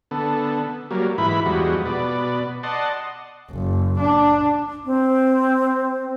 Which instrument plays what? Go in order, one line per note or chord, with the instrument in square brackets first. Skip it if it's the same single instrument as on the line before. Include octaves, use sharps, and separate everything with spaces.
[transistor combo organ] D3 B3 A4
F#3 G3 A#3
G#2 E3 E4 B4 B5
E2 F3 G3 G#3 F#4
B2 B4 D5
D5 D#5 F#5 A5 C6
[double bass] F#1
D4
[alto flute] C4